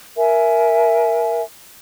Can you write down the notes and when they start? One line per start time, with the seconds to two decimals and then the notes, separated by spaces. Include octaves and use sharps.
0.16 A#4 E5 G#5